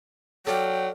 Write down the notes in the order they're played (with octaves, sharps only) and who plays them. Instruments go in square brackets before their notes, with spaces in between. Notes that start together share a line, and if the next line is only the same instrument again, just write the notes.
[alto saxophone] F#3 [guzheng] A4 D5 F5 [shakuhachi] G5